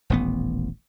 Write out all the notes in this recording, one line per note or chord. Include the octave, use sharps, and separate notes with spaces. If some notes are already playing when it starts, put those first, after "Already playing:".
D#1 A1 B3